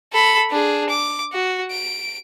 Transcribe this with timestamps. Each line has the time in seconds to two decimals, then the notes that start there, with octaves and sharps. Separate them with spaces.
0.12 A4 B5
0.50 D4 G#4
0.90 D6
1.32 F#4
1.71 D7